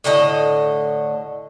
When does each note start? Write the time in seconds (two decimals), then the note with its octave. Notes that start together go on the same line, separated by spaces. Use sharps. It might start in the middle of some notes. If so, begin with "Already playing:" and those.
0.04 A2 D3 A4 D#5